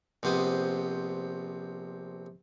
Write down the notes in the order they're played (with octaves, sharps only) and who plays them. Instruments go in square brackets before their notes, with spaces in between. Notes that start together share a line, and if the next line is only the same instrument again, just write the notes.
[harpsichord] A#1 C3 B3 C5 D#6